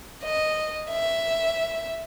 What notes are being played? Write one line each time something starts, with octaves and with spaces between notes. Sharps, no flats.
D#5
E5